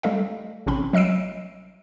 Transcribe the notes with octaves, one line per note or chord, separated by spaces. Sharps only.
G3 A3 A4 D#5 F5
A1 C3 C4 C#4 B5
F#3 D#5 E6 C7 D7